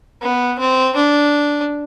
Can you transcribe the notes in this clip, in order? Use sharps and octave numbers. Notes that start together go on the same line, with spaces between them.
B3
C4
D4